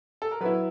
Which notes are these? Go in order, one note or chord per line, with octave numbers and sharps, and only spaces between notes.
A4
A#4
F#3 B3 E4 B4